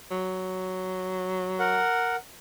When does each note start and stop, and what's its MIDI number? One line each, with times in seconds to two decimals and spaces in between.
0.11 1.81 54
1.59 2.16 70
1.59 2.16 78